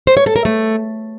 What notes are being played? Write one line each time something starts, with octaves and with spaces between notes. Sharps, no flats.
C5
C#5
A4
A#4
A3